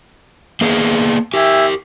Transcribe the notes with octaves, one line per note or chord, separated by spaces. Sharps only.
A#3 B3 G#4
G4 A#4 E5 G5 G#5